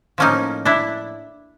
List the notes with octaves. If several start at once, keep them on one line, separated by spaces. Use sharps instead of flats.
A2 F3 A#3 C#4 D#4
D4 E4